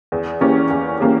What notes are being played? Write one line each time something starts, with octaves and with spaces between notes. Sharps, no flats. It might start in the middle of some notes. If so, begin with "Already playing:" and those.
E2
E3 A#3 C#4 G4
E2
E3 A#3 C#4 G4